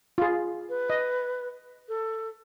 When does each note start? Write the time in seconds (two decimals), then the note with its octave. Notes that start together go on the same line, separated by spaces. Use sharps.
0.18 F4 G#4
0.69 B4
0.90 D#5
1.89 A4